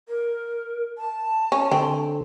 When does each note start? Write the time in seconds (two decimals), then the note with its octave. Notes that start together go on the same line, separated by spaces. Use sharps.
0.09 A#4
0.98 A5
1.52 C#4
1.71 D3 C4